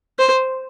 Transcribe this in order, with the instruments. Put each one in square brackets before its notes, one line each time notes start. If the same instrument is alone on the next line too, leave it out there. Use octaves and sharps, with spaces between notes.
[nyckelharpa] C5